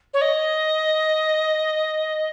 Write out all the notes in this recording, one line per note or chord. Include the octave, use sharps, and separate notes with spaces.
C#5
D#5